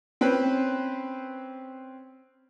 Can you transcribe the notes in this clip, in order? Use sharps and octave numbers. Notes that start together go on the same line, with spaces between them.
C4 C#4 B4 C5 B5